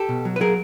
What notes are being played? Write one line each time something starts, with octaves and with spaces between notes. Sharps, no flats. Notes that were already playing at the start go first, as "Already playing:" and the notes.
Already playing: G4 A4
B2
F#3
B4
F#3 G#4 A#4